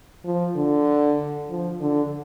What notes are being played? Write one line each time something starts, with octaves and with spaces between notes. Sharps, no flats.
F3
D3
F3
D3